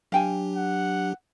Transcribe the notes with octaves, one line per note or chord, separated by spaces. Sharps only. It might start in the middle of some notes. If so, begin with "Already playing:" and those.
F#3 D4 G4 F5 G5 G#5
F#5